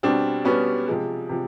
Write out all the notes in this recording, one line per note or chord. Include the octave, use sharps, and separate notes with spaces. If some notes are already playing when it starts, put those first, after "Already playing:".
B2 G3 C4 D4
B2 G3 B3 C#4
C3 F3 G#3
C3 F3